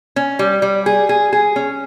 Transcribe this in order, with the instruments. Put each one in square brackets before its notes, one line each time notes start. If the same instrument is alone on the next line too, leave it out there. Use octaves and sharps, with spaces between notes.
[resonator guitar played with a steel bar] C#4
G3
G3
G#4
G#4
G#4
C#4